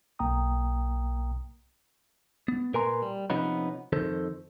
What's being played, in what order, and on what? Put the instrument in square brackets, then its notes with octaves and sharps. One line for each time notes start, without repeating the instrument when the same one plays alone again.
[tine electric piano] B1 A#3 G5 A#5 D#6
[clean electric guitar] B3
A#2 A#4 B4 G#5 A#5 C6
G3
C3 F3 B3 C#4 D#4 B4
F2 D#3 A4 C5